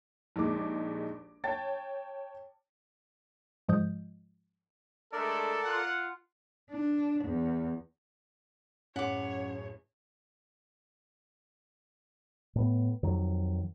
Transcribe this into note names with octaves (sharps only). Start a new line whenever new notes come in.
A#1 D#2 G#3 D6
C#5 G5 A5 A6
G#2 F3 G#3 D#5 D#6 G6
G#3 A3 D4 A4 A#4 D5
F4 F#5
D4
E2
D1 F#2 C#4 C#5 F#5 D6 B6
A2 B3
F2 D#3 F#3